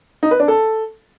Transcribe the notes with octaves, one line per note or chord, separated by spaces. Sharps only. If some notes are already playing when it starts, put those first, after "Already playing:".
D#4
B4
D4
A4